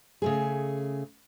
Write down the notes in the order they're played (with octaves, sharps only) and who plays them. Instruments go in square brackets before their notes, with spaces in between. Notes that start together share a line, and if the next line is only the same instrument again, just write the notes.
[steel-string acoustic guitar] C#3 A3 G#4